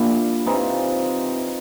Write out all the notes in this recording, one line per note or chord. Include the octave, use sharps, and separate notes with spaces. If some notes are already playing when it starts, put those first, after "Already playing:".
Already playing: A#2 G3 D4 E4
C3 E3 G3 D#4 F4